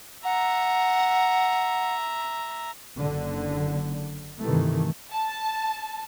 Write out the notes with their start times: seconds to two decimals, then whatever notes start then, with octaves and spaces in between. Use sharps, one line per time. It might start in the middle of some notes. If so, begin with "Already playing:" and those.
0.24 E5 F#5 A#5
2.97 F#1 D3
4.40 G2 C3 D#3 E3 A3
5.11 A5